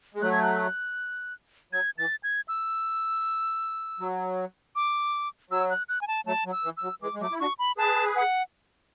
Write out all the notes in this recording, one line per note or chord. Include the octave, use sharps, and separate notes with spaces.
G#3
F#3 A3 F#6
G#6
F#6
F#3 G#6
E3 A6
G#6
E6
F#3
D6
F#3 E6
F#6
F#6
G#5
A5
F#3 A3 A5
F#3
E6
E3
E6
F#3
E3 G#3 D6
G#3
F#3 A3 D6
E4
D4 F#4 C#6
B5
G#4 B4 A5
F#5